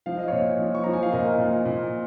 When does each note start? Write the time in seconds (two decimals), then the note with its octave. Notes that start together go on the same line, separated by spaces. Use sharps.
0.06 F3 F5
0.17 D#5
0.28 A#2 C#5 F5
0.59 F3
0.75 C#6
0.84 F3 A#5
0.93 G#5
1.03 F5
1.12 A#2 A#4 D#5
1.38 A#2
1.65 A#2